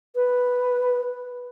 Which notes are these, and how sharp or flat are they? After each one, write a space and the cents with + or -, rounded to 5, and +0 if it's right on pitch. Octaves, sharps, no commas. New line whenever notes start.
B4 +0